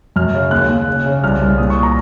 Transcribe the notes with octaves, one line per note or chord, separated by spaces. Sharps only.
F#2 F6
C#3
D#2 F#6
D#2
C#3
C#3
C2 F6
C2
A#2 D#6
C#6
A#5